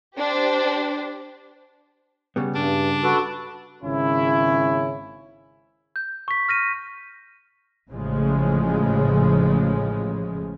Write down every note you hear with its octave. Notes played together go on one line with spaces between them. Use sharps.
D4 G4 C5
C#3 G3 B3
G2 D4
F#4 A4 B4
G#1 C#3 C#4 E4
G6
C#6 B6
F6 A#6 D#7
A1 A2 C#3 F3 G#3